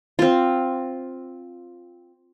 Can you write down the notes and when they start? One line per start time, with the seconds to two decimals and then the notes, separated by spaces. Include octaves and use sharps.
0.19 C4 F4